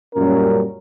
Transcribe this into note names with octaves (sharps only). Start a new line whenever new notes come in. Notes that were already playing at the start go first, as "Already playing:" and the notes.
F#2 A#2 G3 C#4 A#4